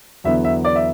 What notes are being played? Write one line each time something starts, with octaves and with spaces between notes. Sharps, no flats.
E2 D3 F#3 B3 E4 E5
E5
D5
E5